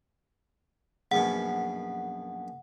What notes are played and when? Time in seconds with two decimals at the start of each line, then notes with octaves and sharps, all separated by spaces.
1.11 A#1 F#2 B2 F#5